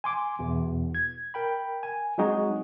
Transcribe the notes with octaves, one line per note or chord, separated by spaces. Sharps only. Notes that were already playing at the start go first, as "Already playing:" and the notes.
G#5 C6 D6
E2 B2
G#6
A#4 G5 B5
G#5
F#3 G#3 C4 D#4 F#4 G#4